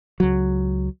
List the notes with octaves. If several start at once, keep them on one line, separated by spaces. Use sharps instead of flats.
C#2 F#3